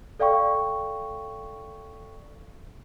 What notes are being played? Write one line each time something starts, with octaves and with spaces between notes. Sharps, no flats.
A4 D5 F5 G5 C#6